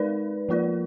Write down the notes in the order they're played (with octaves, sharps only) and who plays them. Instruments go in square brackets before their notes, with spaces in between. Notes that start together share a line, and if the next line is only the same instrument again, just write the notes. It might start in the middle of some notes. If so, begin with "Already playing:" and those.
Already playing: [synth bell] G#3 D#4 A#4 D5 [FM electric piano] B4
[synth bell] F3 A#3 F4 A#4 D5